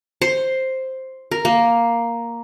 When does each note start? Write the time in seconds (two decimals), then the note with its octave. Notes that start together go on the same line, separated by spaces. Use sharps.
0.21 C5
1.31 A#4
1.45 A#3